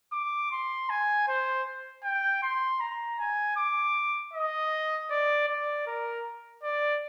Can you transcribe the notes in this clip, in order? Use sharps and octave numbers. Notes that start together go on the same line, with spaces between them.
D6
C6
G#5
C5
G5
C6
A#5
G#5
D6
D#5
D5
D5
A#4
D5